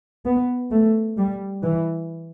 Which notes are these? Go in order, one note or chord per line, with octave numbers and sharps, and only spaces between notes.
B3
A3
G3
E3